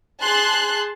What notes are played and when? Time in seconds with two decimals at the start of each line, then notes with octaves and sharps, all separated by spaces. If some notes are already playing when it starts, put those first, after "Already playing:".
0.22 G#4 A5 C6 F#6